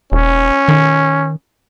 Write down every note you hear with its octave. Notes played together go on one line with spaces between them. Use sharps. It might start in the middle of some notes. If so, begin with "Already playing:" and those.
E1 C#4
D#3